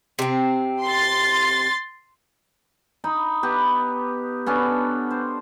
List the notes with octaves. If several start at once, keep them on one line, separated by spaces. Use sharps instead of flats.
C3 C4
C6 A6
D#4 B5
B3 G4 B4
B3 C#4 D4 A4
C5